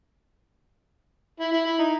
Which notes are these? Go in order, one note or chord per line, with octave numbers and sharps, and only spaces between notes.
E4
E4
E4
D#4